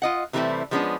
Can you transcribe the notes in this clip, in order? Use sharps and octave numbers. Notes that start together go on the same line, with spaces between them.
F4 D#5 F#5
C3 E3 G3 A3 C4 E4
F3 G#3 B3 C#4 D4